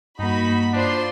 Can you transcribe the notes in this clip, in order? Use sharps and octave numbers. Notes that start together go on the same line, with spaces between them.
G2 A#3 D#4 F#4 B5
D4 F4 C5 C6